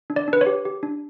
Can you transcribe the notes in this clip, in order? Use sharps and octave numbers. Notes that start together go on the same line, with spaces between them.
D4
D5
D4 B4
C#5
G4
G4
D4